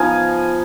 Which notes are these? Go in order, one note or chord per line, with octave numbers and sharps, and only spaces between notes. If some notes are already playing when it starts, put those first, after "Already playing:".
Already playing: F3 B3 D#4 F5 G#5